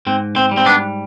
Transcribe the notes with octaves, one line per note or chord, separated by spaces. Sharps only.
G#2 C4
C4
G3
C4
B3 D4